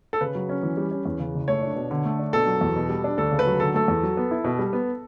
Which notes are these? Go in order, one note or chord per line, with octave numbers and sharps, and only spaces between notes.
A4
C#3 B4
F#3
C#4
E3
G3
C#4
E2
C#3
F#1
A3 C#5
D4
B2
D3
A3
D4
B2 A4
F#3
E2
B2
G3
D4
D2 A4
C#3
B4
F#3
D3 A4
A3 A4
E2
F#3
B3
E4
B2
G3
B3